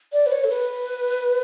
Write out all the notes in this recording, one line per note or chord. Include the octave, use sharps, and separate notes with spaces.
D5
B4
C#5
A4
B4